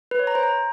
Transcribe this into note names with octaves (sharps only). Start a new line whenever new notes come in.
B4
C#5
A#5
C5
A#5